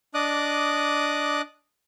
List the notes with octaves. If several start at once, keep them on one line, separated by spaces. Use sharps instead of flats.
D4 D#5 D6 D#6 F#6